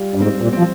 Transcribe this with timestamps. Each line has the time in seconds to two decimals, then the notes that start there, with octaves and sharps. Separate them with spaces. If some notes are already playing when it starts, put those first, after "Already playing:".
Already playing: G3 F4
0.15 G2
0.21 G#2 C4
0.42 A#2
0.53 C4
0.58 F3